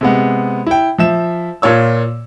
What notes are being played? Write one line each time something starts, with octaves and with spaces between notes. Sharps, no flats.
C3 G#3 B3
E4 G5
F3 E5 E7
A#2 F4 C#5 E6